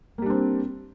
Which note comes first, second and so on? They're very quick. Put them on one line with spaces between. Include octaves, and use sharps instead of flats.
A#3 G3 D4 C4